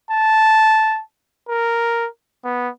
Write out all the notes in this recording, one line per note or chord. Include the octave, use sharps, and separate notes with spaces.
A5
A#4
B3